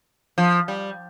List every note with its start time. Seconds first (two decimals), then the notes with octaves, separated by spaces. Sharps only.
0.38 F3
0.68 G3